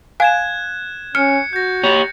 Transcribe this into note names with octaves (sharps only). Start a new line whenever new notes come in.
F5 G#5 F#6 G#6 E7
C#4 F6 C#7
F#4 G6 A#6
G4 C#5